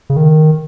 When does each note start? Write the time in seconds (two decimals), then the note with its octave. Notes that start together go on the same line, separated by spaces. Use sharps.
0.10 C#3
0.17 D#3